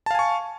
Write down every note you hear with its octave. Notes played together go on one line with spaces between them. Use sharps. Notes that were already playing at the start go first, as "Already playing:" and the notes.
F5 G#5 A5 C#6